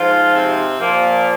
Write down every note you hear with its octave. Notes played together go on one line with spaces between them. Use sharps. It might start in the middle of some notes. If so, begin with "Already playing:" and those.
Already playing: G#2 F3 F4
C3 C4
A#2 F3 A#3